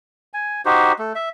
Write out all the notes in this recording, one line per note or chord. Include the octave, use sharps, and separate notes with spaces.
G#5
D#4 F#4 G4 C5
A3
E5